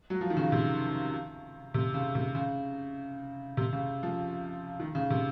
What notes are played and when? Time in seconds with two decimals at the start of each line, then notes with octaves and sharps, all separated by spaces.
0.10 F#3
0.21 F3
0.30 D#3
0.37 C#3
0.52 C3
1.74 C3
1.94 C#3
2.15 C3
2.35 C#3
3.57 C3
3.73 C#3
4.03 F3
4.80 D#3
4.95 C#3
5.10 C3